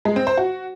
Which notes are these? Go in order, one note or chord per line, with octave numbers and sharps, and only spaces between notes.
G#3
C4
C5
F#4